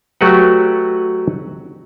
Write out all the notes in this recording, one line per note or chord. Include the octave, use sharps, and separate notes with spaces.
F#3 A3 F#4 G4 B4 F#5